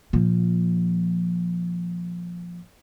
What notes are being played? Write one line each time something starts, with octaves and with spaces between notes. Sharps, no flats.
A#2 F3